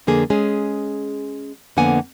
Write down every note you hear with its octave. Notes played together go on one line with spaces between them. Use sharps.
F2 D3 A#3 G#4
G#3 C#4 G#4
F2 D3 A#3 B3 F#5 G#5